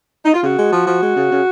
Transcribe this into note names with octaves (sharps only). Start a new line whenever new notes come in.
D#4
F4
C#3 F#4
G#3
F3
F3
G#3
C#3
C#3